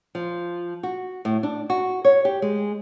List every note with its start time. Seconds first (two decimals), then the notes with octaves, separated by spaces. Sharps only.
0.15 F3
0.83 F#4
1.25 A2
1.43 D4
1.70 F#4
2.05 C#5
2.25 G4
2.42 G#3